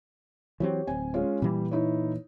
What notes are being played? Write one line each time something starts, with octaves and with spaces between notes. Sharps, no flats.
E3 F#3 C4 G4 C#5
D1 C4 G#5
G#3 C#4 F4
A#2 E3 G3
D#4 E4 C#5